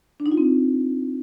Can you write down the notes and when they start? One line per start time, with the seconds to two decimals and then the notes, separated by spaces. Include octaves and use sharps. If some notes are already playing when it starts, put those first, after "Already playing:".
0.20 D4
0.26 D#4
0.32 F4
0.37 C4